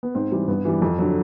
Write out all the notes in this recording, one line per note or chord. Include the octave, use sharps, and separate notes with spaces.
B3
G#2 C4
E3 G3
G2 B3
E3 G3
F2
D3 F#3